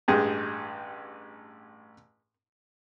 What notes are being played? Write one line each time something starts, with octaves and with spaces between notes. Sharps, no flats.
A1 G2 G#3 G4 G#4